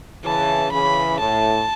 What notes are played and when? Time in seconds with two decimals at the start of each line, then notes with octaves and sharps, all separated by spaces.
0.24 C#3 E3 A5
0.71 C#3 E3 B5
1.20 A2 A5